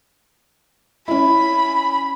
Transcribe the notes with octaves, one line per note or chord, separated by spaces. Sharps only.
C#4 E4 B5